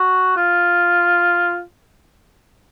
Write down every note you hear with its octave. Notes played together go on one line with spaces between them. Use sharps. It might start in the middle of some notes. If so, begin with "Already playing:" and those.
Already playing: F#4
F4